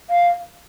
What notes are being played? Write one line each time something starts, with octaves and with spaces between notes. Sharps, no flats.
F5